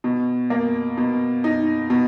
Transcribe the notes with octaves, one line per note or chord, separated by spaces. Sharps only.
B2
A#3
B2
D#4
B2